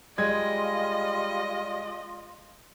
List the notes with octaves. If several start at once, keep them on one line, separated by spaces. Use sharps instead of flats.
G3 G#3 F4 D#5 G#6